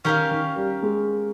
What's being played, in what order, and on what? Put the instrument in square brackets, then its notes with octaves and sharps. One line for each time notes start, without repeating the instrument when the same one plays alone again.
[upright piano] D#3 [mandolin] C#4 G4 A#4 F5
[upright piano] D#3
G3
G#3